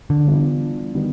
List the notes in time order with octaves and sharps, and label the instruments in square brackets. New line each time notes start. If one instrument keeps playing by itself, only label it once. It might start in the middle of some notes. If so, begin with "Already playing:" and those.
[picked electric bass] D3
[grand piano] E3 G3 B3 D4 F4
D#3 G3 B3